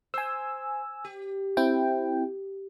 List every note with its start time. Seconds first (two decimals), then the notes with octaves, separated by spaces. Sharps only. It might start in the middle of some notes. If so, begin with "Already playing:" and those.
0.14 C5 G#5 E6
1.05 G4
1.57 C4 E4 G5